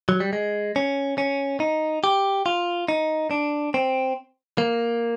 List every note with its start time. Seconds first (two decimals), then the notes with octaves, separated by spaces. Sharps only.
0.09 F#3
0.20 G3
0.33 G#3
0.76 C#4
1.18 C#4
1.60 D#4
2.04 G4
2.46 F4
2.88 D#4
3.31 D4
3.74 C4
4.58 A#3